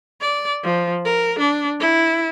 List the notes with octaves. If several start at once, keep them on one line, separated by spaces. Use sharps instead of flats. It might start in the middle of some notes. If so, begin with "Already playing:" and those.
D5
F3
A#4
D4
E4